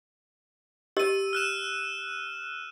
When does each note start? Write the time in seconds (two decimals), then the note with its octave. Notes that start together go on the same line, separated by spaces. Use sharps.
0.97 G4 D#5 E6 D#7
1.33 F6 F#6 E7